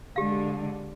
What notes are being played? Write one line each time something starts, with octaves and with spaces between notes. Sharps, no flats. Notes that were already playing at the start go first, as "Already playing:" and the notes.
D3 G#3 G4 F5